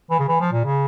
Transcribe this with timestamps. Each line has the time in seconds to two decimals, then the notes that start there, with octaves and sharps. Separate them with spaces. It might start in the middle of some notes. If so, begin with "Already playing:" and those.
0.10 E3
0.19 C#3
0.28 E3
0.40 F3
0.52 A#2
0.65 C#3